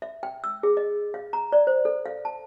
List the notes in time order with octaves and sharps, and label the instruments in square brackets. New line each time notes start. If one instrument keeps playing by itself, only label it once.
[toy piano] E5
G5
E6
G#4
D#5
F5
A#5
D5
C5
A4
F5
A5